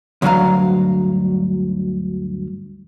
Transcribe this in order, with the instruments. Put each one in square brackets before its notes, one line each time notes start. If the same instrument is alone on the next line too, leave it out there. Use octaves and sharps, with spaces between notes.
[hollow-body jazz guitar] D2 G2 F#3 F5 A#5